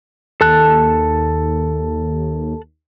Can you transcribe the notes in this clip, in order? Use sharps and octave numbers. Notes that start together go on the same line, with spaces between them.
D#2 A4 A5 F#6